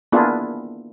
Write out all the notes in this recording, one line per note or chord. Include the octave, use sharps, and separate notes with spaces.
A#3 B3 D4 E4 F4 G#4